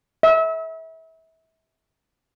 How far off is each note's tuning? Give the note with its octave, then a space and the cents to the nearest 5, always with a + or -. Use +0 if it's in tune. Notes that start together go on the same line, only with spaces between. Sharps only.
E5 -30